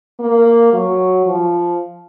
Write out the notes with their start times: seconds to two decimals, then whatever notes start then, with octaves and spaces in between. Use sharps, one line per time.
0.19 A#3
0.73 F#3
1.26 F3